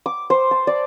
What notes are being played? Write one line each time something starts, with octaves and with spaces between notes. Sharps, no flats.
D6
C5
A5
D5